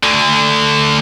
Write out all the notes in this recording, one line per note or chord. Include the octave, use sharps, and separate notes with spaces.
D2 D3